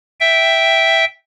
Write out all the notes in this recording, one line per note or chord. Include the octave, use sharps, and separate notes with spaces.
E5 G5